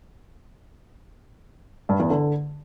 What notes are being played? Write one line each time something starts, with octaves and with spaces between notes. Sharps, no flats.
G2
E2
D3